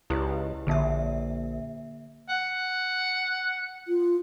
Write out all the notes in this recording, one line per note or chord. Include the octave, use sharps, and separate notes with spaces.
C#2 E4 G4 B4
A#1 D3 A#3 E5
F#5
F4